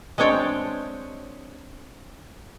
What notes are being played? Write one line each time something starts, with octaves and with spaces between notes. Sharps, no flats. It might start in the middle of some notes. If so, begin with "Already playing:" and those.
G#3 C4 D4 C#5 G5